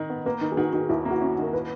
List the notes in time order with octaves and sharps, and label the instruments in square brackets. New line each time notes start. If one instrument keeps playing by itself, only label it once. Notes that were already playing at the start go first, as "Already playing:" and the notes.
Already playing: [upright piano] D#3 D#4
B3
[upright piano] A#3 [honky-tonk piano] B4
[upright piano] D#3
[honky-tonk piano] G#4
[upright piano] D#3 [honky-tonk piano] F#4
[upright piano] D#3 [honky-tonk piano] F#4
[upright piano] D#2 [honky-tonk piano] E4
[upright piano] A#3
[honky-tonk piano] F#4
[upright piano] C#4
[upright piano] D#3 [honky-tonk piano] A#4
[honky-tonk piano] B4